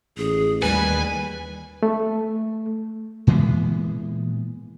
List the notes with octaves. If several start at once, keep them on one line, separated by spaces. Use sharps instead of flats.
A1 G#4
D#2 G3 B4 G#5
A3
A#2 E3 G#3 B3